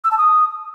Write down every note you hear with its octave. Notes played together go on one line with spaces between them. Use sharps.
E6
A5
D#6